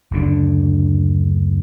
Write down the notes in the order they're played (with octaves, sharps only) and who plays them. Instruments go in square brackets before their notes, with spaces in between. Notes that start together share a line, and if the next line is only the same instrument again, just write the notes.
[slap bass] F#1 D2 D3 D4